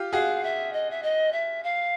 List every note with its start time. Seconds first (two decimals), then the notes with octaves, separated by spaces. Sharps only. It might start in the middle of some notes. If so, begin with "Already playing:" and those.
Already playing: F4 G4
0.13 F#4 G#4 F5
0.43 E5
0.73 D#5
0.91 E5
1.03 D#5
1.32 E5
1.63 F5